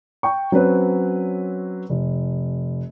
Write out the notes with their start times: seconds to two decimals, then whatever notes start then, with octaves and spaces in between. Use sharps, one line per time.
0.23 G5 C#6
0.52 F#3 C4 C#4 B4 C#5
1.89 F1